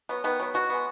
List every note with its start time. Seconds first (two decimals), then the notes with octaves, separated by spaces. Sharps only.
0.09 F#3 B3
0.24 D#3 B3
0.40 F#3 B3
0.54 B2 F#4
0.70 G#3 B3